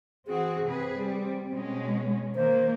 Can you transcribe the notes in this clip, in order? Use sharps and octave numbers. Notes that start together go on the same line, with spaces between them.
E3 C4 F#4 G#4
C3 C4 G#4 B4
G3
B2 G#3 C#4
D#3 A#3 C5